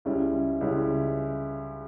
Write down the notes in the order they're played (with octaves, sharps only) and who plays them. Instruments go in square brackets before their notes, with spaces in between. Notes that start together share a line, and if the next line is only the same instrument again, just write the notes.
[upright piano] C#2 C#3 G3 C#4 E4
C#2 C#3 G3 C#4 E4